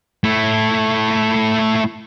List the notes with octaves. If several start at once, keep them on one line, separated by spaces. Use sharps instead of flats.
A3 E4